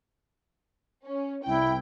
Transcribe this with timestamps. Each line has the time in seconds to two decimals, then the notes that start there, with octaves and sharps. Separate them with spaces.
1.06 C#4
1.45 C2 E4 G5